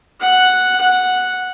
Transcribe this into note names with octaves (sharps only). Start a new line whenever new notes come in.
F#5
F#5